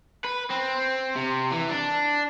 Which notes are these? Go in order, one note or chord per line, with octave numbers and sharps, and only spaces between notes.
B4
C4
C3
E3
D4